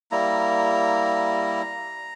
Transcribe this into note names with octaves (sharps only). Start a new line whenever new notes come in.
G3 A#3 E4 A#5